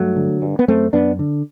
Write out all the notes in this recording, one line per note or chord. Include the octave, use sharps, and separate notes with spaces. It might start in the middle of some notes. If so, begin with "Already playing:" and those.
Already playing: G2 F#3 A3
D3
G2
B3
F#2 A3 C4
F#2 B3 D4
D3